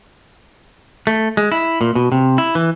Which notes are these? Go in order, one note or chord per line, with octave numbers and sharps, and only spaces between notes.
A3
G#3
E4
A#2
B2
C3
E4
E3